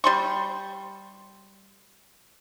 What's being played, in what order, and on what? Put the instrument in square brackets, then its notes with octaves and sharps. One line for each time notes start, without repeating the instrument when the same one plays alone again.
[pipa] G3 C6 C#6